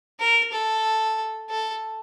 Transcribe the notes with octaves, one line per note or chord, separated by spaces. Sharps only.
A#4
A4
A4